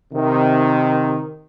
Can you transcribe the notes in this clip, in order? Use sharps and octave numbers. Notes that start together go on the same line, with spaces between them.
C3 D#3